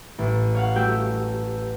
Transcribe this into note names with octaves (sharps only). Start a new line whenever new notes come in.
A1
C#5 F5 F#5
A3 F#4 G4 E6 G6